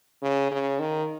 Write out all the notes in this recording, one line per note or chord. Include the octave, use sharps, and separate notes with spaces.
C#3
C#3
D#3